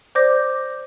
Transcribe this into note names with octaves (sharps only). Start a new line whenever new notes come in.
C5 D5 D6 G6 A#6